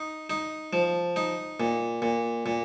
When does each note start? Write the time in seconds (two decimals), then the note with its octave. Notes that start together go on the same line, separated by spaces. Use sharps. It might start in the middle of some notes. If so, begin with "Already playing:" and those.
Already playing: D#4
0.30 D#4
0.73 F3
1.16 D#4
1.60 A#2
2.02 A#2
2.46 A#2